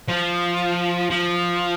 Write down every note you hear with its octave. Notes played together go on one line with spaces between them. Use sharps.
F3
F3